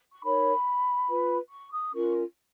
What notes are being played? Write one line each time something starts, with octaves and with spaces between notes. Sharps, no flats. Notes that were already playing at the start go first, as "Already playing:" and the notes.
C#6
D#4 A#4 C#5 B5
F4 B4
C#6
D#6
C#4 F4 A#4 C#6